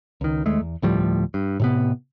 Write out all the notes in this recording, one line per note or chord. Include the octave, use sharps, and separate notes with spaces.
C#2 D#3
D#2 G#3 A3
E2
D2 A2 F3 G3
G2
A2 C3 B3